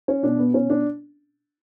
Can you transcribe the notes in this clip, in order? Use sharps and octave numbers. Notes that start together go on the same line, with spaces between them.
C#4
B2 D4
B3
B2 C#4
D4